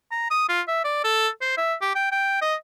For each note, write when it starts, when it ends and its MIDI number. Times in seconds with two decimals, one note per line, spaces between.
0.11 0.28 82
0.31 0.44 87
0.49 0.61 65
0.68 0.83 76
0.84 1.02 74
1.04 1.28 69
1.42 1.53 72
1.58 1.74 76
1.82 1.92 67
1.95 2.11 79
2.12 2.40 79
2.42 2.55 75